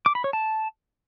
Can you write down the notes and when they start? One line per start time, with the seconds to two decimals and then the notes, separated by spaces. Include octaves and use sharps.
0.06 D6
0.15 B5
0.24 C#5
0.33 A5